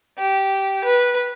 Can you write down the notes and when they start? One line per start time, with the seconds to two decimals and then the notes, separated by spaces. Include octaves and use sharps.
0.18 G4
0.84 B4